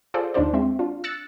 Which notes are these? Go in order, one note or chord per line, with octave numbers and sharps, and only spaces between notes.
F4 G#4 A4 C5 D5 F5
D#2 D4 D#4 F4 C5 D5
G#3 C4 E5
D4 F4
E6 F#6 A6 C#7